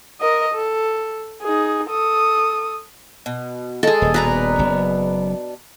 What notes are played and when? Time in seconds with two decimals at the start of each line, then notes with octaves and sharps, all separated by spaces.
0.21 A#4 D#5
0.54 A4
1.43 D#4 G#4
1.90 A4 D#6
3.26 B2
3.83 G#3 G#4 A4
4.02 D#1
4.14 B2 B3 D4 B4 A#5
4.59 F#1